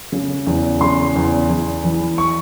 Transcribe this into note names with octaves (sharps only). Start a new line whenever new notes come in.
C#3
E2
C#3 C6
E2
E2
E3
C#6